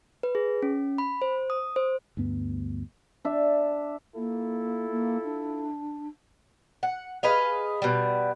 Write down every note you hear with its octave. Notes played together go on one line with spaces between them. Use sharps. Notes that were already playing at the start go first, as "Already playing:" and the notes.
B4
G#4
C#4
B5
C5
D#6
C5
D2 G2 B3
D4 E5
A#3 E4 F4 A4
A#3
D4
F#5
G#4 B4 D#5 F5
B2 G3